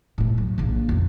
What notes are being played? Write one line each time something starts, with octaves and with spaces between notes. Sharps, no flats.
A2 A3
F#3
A#1 A#3
F2 C#3